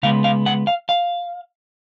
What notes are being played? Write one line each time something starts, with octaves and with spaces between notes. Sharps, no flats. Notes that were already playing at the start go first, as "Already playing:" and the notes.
C#3 G#3 B3 F5
F5
F#5
F5
F5